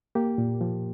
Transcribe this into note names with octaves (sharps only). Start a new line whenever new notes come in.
A#3 G4
A#2
F3